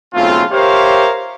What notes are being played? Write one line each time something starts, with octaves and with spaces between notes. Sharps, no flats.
B1 C#3 A3 C4 F4
G4 A#4 C5 C#5 E5 F5